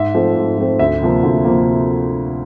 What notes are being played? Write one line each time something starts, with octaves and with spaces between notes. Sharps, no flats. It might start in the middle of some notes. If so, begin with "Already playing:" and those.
Already playing: G#2 E5
F3 A3 C4
G#2
F3 A3 C4
D2 E5
C3 F3 A#3
D2
C3 F3 A#3